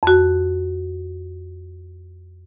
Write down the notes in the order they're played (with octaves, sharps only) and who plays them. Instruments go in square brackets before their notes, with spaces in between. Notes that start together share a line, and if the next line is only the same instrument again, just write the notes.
[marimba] F2 F#4